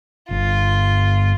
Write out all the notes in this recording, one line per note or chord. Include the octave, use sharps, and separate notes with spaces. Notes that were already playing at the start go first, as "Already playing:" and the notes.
G1 F4